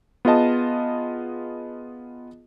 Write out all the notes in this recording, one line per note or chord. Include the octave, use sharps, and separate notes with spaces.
B3 F4 G#4 D#5 A5